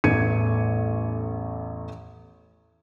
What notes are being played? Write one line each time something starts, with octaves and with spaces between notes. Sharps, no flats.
A1 E2 A3 G#6 C#7 D#7